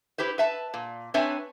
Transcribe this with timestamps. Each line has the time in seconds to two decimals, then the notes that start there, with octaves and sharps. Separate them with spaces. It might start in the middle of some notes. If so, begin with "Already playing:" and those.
0.18 E4 G4 B4 C5
0.38 B4 E5 A5
0.74 A#2
1.14 C4 D4 B4 C#5 E5 G#5